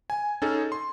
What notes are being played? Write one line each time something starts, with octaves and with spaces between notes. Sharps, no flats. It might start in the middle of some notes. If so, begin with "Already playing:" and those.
G#5
C#4 D#4 G#4 A4
C6